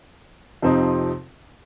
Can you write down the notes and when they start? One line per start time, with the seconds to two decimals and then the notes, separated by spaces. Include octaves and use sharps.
0.62 F2 C3 F3 C4 D#4